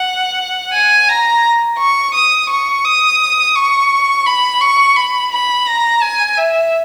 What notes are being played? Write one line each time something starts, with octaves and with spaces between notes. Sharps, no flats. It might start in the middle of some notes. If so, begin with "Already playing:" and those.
Already playing: F#5
G#5
A#5
C#6
D#6
C#6
D#6
C#6
B5
C#6
B5
B5
A#5
G#5
E5